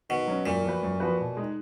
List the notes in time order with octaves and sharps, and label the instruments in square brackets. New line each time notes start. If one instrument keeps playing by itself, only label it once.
[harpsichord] B2 [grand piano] D#3
[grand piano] F#3 C#4 F#4
[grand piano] F#2 [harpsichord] A#2
[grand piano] F3 B3 F#4 B4
F#2
F3 B3 F#4 B4
B2
G#3 D#4